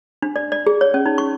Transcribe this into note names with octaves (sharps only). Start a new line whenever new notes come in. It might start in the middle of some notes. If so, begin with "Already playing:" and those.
D4
D5
D5
G#4
C#5
C#4
D#4
C#6